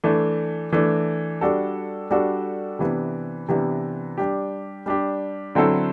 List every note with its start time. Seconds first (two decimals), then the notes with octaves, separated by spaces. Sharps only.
0.04 E3 A3 D4
0.72 E3 A3 D4
1.41 G3 D4 F#4 A4
2.11 G3 D4 F#4 A4
2.79 C3 E3 B3 D4
3.48 C3 E3 B3 D4
4.18 G3 D4 G4
4.86 G3 D4 G4
5.55 D3 F#3 C4 E4 A4